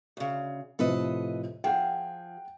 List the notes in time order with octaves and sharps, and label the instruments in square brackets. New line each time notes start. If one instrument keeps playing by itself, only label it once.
[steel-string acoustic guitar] D2 C#3
[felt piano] A2 C3 F3 [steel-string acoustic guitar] A4 B4 D#5
[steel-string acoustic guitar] F3 G#4 [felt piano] F#5 G5